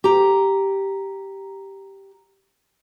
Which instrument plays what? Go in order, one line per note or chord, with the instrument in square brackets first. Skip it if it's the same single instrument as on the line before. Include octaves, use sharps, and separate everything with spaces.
[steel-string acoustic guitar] G4 A#5